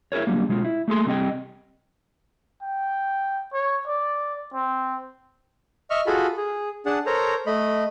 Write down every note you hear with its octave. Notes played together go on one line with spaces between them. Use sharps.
E4 G#4 A#4 C#5
D3 F#3 G3 A#3
B2 G#3 F4
E4
A3 A#3 G#4 A4 C6
C2 G3 C4 C5 D#5 G5
G5
C#5
D5
C4
D#5 E5 C#6 F6
F4 F#4 G#4 A4 B5
G#4
D4 G#4 F#5 A5
A4 A#4 C5 C#5 A#5
A3 D#5 B5